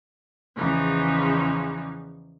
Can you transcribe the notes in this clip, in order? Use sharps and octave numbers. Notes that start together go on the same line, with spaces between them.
E2 C#3 E3 F3 D#4